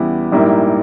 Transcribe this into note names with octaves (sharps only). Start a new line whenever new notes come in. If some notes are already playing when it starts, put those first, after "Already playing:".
Already playing: E2 C#3 G3 B3 E4
A#1 G#2 G3 A#3 E4